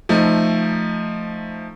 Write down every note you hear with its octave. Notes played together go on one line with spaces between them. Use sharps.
F3 A3 D#4